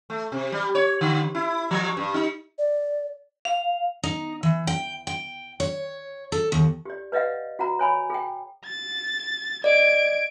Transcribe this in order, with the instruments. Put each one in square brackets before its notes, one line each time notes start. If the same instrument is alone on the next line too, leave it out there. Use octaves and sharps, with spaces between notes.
[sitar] A3
C3
G3
C#5
D3
E4
F3
G2
D#4
[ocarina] D5
[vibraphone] F5
[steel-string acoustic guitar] D#4
E3
G5
G5
C#5
A4
D#2
[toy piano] G4 D5
B4 D5 D#5 F5 F#5
F#4 F#5 A#5
C#5 G#5 B5
G#4 G5
[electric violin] A6
[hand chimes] D5 D#5 [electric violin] G#6 D7